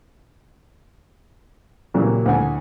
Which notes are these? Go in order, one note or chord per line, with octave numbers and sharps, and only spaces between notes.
A#2 C#3 E3 F#3 G3 A#3
D2 A2 F#5 G#5